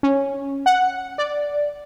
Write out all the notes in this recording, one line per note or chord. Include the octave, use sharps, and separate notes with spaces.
C#4
F#5
D5